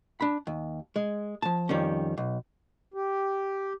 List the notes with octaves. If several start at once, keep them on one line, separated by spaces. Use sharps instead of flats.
D4 B5
D#2
G#3
F3 A5
F2 D#3 G3 C#4
B1
G4